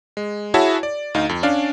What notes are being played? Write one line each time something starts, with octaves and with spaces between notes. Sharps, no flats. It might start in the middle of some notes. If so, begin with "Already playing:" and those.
G#3
E4 F#4 G#4 C#5 E5 A5
D5
D2 D#4 F5
F2
C#4 D4 D5 F5